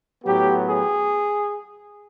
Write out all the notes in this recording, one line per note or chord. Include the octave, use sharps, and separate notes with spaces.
A2 F#3 B3 G4
G#4